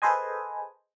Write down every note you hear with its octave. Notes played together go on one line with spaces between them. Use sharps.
G#4 A4 B4 C5 D#5 G#5